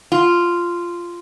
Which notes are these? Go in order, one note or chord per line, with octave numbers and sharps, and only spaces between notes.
F4